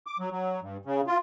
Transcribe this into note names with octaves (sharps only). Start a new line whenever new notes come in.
D6
F#3
F#3
G2
C#3
F4